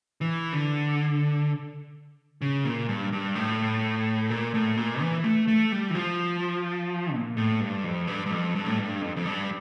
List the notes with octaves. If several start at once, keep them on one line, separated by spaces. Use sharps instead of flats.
E3
D3
C#3
A#2
G2
G2
A2
A#2
A2
A#2
E3
A3
A3
G3
E3
F3
A#2
A2
G2
F2
G2
G2
F2
G2
A2
G2
F2
F2
G2